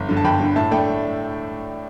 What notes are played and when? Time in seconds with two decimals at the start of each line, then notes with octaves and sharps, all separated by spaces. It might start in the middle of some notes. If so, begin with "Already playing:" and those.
Already playing: G1
0.09 G2 D3
0.17 A5
0.24 G1 G5 B5
0.39 G2 D3
0.56 A2 E5 A5
0.71 A3 D4 G5 B5